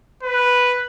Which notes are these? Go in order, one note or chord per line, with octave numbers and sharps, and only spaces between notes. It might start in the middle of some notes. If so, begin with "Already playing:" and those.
B4